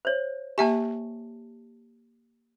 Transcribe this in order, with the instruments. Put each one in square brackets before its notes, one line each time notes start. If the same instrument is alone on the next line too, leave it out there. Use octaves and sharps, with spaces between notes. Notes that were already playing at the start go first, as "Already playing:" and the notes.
[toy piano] C5 C#5
[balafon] A#3 E5 G#5 [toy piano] G4 A5